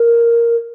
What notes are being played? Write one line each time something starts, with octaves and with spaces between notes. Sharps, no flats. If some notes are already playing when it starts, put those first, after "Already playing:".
Already playing: A#4